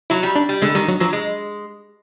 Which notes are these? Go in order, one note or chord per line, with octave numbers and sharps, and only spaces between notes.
F#3 E4
G3
D4
G3
D3 G#3
D#3 G3
F#3
F3 F#3
G#3